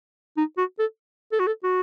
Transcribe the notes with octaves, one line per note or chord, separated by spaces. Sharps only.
D#4
F#4
A4
A4
F#4
A4
F#4